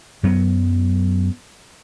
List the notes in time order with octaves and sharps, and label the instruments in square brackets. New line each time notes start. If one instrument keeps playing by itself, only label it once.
[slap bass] F#2 F#3 B3